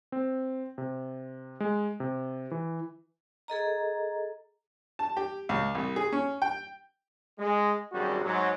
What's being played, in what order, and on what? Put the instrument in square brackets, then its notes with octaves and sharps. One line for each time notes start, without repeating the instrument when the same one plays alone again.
[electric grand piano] C4
C3
G#3
C3
E3
[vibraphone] G#4 A4 D#5 A#5
[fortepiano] A5
G4
C#2
C2
G#4
C#4
G5
[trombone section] G#3
G#1 F#2 G3 F#4 G#4
G#2 F#3